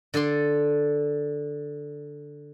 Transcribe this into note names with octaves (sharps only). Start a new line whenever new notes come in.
D3 A4 D5 C6